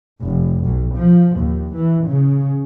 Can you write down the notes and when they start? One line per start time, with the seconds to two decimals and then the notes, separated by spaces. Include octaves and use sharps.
0.23 F1
0.63 B1
0.94 F3
1.38 D#2
1.75 E3
2.07 C#3